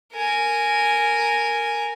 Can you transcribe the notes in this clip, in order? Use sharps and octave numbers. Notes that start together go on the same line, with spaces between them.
A#4 G#5